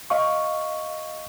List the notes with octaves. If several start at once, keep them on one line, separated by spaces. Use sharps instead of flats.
D#5 F5 C#6